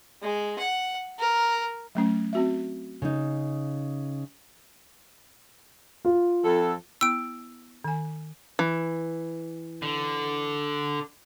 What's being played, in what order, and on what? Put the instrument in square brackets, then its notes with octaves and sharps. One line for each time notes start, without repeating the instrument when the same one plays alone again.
[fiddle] G#3
F#5
A#4
[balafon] F#3 A3 C#4
C4 F#4 E5
[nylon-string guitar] C#3 D#4
[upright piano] F4
[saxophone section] F2 A4
[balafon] B3 E4 [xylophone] E6 D7
[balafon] D#3 G#5
[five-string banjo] E3
[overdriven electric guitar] D3